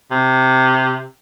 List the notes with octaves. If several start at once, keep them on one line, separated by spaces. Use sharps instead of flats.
C3